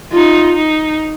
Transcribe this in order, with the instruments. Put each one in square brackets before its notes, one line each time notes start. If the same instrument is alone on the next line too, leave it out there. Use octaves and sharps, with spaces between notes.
[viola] D#4 [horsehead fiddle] F4
[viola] D#4